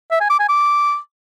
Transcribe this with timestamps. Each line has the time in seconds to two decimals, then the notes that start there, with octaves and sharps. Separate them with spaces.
0.11 E5
0.21 G#5
0.30 D6
0.39 G#5
0.49 D6